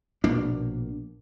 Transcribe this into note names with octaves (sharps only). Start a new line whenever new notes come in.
A#1 B2 A#3 D4